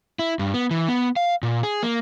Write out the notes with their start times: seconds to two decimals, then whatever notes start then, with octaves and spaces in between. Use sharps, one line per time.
0.19 E4
0.39 G2
0.54 B3
0.71 E3
0.88 B3
1.16 F5
1.43 A#2
1.63 G#4
1.83 A#3